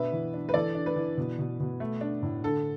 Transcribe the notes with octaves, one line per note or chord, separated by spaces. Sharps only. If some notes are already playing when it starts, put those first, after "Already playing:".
Already playing: B2 D4 B4 E5
E3
D4
B4
E3 A4 D5
D4
B4
E3
B2
B2
B2
A3
D4
A2
D3 A4